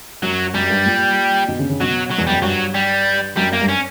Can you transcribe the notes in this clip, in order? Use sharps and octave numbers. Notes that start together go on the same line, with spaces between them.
F#2 F#3
F#2 G3
G2
A#2
B2
C#3
C#3
B2 F#3
F#3
E2
F#2 G3
G2 F#3
G3
F#2 G3
A#3
G2
C#4